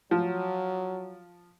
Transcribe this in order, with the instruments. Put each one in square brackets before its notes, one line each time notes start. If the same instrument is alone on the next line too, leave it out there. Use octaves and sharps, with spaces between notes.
[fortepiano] F3 [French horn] F#3